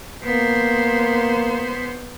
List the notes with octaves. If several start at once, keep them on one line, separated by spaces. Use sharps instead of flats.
A#3 B3 C5